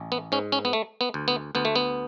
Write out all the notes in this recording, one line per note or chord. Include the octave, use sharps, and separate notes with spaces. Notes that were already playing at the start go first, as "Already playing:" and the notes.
Already playing: A1
B3
G#2 C#4
C#4
B3
A3
B3
D2
B3
D2 B3
A3
B3